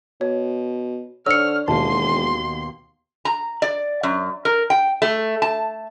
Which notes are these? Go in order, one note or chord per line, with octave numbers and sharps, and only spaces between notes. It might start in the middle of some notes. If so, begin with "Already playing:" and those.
B2 C#5
D3 C5 C#5 E6 F6 C#7
E1 D#2 B2 A5 C6
A#5
D5
F#2
A#4
G5
A3
A5